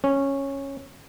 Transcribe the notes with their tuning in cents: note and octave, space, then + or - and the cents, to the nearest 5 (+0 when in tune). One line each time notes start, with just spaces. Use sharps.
C#4 -10